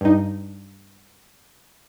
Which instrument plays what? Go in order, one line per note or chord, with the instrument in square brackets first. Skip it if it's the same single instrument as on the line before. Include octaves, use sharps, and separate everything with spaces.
[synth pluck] G2 D#4